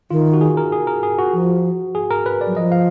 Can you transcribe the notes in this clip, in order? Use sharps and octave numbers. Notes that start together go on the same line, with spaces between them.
D#3 F4
F#4
G#4
A#4
G#4
A#4
G#4
F#4
F3
G#4
A#4
B4
D5
F#3
F3 D#5
F5